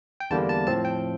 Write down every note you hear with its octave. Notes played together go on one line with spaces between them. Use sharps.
G5
E2 D3 G3 A#3 A5
A5
A2 F3 C4 A5
G5